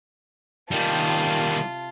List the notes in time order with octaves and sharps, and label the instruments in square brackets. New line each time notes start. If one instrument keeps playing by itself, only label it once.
[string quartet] C3 F4 A5 [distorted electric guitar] D#3 G3